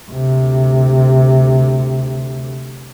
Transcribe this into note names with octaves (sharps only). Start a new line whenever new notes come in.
D2 C3